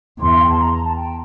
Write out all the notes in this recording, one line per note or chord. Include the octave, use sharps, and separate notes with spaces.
E2 C6
E5
F5
G5
A5
A#5
A#5
A5
G5